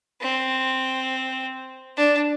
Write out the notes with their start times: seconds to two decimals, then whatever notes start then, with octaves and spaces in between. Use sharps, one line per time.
0.21 C4
1.97 D4